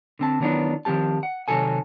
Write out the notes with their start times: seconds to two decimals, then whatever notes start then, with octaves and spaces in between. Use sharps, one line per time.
0.19 D3 C4 A5
0.40 D#3 E3 F#3 B3 D4 D#4
0.85 D#3 F3 C4 G4 A5
1.23 F#5
1.48 C3 D#3 F#3 A4 G#5